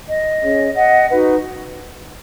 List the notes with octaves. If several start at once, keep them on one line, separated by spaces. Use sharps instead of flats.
D#5
C#4 G#4 C#5
D#5 F#5
D#4 F#4 B4